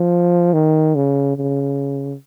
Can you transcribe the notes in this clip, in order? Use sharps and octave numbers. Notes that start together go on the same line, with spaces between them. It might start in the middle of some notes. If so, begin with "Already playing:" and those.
Already playing: F3
D#3
C#3
C#3